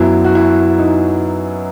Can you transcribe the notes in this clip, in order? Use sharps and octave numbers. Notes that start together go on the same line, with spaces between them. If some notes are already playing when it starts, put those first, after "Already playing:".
Already playing: F#2 F#3 B3 E4
F#4
E4
D#4